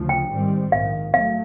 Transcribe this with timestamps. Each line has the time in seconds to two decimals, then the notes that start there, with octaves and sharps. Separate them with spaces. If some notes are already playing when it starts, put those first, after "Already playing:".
Already playing: D2 C#3 F3
0.09 G5
0.30 G#2 D#3 G3 C4
0.72 A#1 G#2 D#3 F5
1.13 F#3 A3 F5